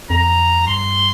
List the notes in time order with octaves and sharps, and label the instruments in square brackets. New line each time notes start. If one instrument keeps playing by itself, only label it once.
[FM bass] F2 [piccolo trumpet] A#5
[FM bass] G2 [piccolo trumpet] C6